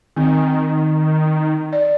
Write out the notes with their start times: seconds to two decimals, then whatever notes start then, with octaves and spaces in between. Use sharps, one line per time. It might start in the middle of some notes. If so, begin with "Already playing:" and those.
0.16 D#3 C4
1.73 D5